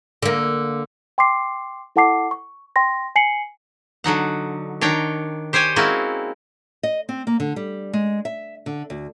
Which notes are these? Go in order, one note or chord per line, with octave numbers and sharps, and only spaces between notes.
D3 A#3
G5 C6 D6 C7
E4 A4 F#5 A5 D6 C7
C#6
G5 C6 A#6
G#5 C7 C#7 F#7
D3 F#3 D#4 F#5
D#3 D4 C#5 G5 A#5
G4 C5 C#5 G5 G#5
G#3 A#3 C4 C#4 E4 F#4
D#5
C4
A#3
D3
G3
G#3
E5
D3
D2